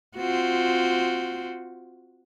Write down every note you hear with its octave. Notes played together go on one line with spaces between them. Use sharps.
C4 F4 F#4